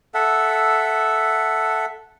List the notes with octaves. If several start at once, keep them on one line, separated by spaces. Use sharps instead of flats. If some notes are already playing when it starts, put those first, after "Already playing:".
A4 E5 F#5